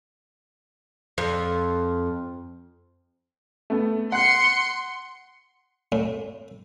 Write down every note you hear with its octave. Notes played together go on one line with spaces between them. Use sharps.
F2
A3 B3
F#5 C6 F#6 C#7
A2